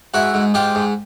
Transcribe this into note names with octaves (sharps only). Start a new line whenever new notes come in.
G#2 E4 F#4
G#2
G#2 F4 G4
G#2